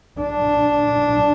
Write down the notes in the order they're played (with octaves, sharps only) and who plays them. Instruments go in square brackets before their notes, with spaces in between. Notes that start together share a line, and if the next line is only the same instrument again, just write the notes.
[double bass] D4